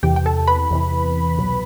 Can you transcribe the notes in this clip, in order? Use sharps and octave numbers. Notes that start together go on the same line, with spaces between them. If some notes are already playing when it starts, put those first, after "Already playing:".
E2 C3 E3 G4 G5
G5
A4 A5
B4 B5
E2 C3 E3
C2 B2 F#3